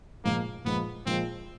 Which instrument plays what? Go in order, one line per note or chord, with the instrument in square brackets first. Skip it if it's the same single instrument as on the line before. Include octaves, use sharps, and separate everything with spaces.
[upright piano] A#2 F3 G#3 [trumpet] A#3
[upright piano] A#2 F3 G#3 [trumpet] B3
[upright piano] A#2 F3 G#3 [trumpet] C4